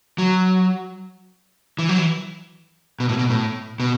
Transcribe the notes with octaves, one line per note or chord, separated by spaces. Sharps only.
F#3
E3
F#3
E3
B2
A2
B2
A2
B2